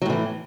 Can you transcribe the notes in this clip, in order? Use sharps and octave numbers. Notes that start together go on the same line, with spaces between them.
A2 E3 F#3